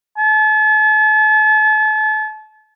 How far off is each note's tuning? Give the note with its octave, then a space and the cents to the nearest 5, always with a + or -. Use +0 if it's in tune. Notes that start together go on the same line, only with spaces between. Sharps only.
A5 -40